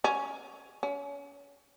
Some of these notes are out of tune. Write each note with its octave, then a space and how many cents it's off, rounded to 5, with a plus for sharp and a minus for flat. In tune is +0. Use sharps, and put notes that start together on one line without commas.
C#4 +0
C#4 +30